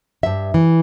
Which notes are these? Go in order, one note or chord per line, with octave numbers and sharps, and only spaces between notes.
G2 E5
E3